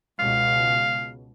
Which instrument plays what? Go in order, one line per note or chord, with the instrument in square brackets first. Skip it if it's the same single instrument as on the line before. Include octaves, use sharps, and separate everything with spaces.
[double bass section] C#2 B2 [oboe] F5